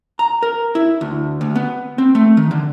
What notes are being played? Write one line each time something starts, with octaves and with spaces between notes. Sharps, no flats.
A#5
A#4
E4
D2
D2
B3
C4
A3
D#3
D3